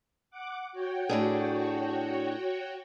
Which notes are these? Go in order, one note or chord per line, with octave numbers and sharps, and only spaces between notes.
F#5 D6
F#4 C#5 G5
A2 D4 G#4